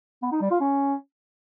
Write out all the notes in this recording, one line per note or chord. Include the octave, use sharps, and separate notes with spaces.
B3
D#4
G3
F4
C#4